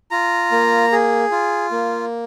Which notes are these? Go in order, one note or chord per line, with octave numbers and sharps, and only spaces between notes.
F4 A#5
A#3
G#4
F4
A#3